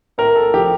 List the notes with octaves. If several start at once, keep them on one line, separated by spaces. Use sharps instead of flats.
A2 A#4
A4
F3 G4